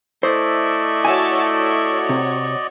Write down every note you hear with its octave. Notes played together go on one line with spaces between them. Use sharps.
A3 E4 C5 D5 D#5
F#4 C#5 E5 G#5 A5
F#4 C#5
C3